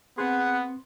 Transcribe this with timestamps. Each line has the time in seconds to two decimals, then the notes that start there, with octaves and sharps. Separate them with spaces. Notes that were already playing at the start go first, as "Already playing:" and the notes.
0.18 B3 C4 G#4 F#5 C6